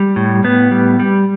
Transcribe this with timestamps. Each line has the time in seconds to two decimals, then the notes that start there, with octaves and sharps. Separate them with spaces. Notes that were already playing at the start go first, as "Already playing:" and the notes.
Already playing: G3
0.16 A2
0.44 A2 B3
0.71 G3
0.99 G3